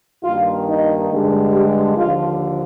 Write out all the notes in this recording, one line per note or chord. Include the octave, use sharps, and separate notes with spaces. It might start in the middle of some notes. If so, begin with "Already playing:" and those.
G2 D#3 A#3 F4
D#4
G2 D3 G#3
G4
D#2 D3 F3 F4